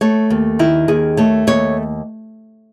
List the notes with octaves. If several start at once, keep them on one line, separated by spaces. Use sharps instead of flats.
A3 C#5
D#2
D#3 E4
D#2 G#4
A3 C#5
D#2 C#5